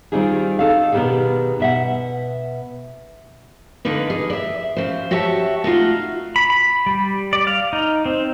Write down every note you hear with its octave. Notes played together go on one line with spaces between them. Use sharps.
D#3 G3 C4 D#4 F4 G#4
D#4 A4 F5
B2 D#3 G3 B3 G4 G#4
B2 E5 F#5
D3 A#3 D#4 B4
G#4
D5 E5
C#3 C5
F#4 G4 C#5 E5 A5
A3 D#4 F4 F#4
B5
B5
G3
D5
F5
D#4
C4